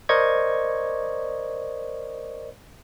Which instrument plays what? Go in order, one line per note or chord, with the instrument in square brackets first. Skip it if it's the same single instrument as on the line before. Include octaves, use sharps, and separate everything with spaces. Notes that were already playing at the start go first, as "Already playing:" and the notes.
[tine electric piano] A#4 C5 D5 D#5 C#6 G#6